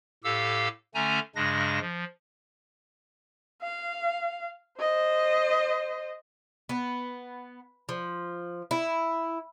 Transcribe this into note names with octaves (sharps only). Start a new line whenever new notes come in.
A2 G4 A4 F5 E6
D3 A3 C#4 G#5 A#5
G2 C#3 G#3 D4 A#6
F3
F5
C5 D#5
B3
F3
E4